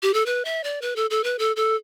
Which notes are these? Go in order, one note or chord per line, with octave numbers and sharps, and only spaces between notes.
G4
A4
B4
E5
D5
B4
A4
A4
B4
A4
A4